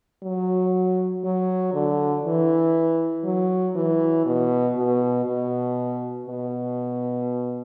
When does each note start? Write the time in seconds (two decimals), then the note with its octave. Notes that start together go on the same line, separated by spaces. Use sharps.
0.23 F#3
1.24 F#3
1.74 D3
2.25 E3
3.25 F#3
3.75 E3
4.26 B2
4.76 B2
5.26 B2
6.27 B2